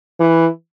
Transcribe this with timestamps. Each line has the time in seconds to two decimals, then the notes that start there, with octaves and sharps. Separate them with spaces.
0.20 E3